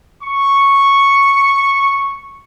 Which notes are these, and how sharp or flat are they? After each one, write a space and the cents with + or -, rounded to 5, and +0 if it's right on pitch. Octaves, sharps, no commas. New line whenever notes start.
C#6 -5